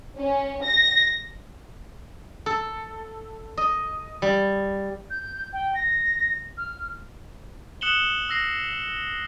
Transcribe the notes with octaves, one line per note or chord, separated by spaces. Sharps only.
C#4
A#6
A4
D#5
G3
G6
G5
A#6
F6
D#6 F#6 C#7 E7 F#7 G7
D#6 E6 A#6 C7